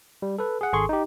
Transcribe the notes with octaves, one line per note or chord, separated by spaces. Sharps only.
G3
A4 B4
G#4 F#5
G#1 G#4 A4 C6 C#6
D#4 G4